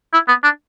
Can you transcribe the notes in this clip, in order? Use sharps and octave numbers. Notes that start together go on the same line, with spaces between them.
E4
B3
D4